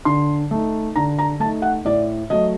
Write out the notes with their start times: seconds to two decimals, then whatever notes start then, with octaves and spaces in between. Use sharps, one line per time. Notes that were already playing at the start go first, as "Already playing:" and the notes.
0.05 D3 C6
0.51 A3 D#4
0.96 D3 A#5
1.19 A#5
1.40 A3 A5
1.45 D#4
1.62 F#5
1.85 A2 D5
2.30 F#3 A3 D#5